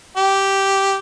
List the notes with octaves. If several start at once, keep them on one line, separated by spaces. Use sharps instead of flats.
G4